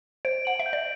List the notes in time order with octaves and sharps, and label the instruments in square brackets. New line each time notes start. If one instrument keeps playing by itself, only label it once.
[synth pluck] C5 [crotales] D7
[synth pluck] F#5 [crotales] F#7
[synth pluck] E5
[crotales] G6
[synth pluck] D5